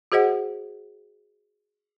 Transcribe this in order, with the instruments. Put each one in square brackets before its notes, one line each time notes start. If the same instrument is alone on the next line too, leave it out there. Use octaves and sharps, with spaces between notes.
[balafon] F#4 G#4 C5 D#5 F#5